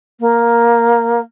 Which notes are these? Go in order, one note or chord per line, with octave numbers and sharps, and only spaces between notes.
A#3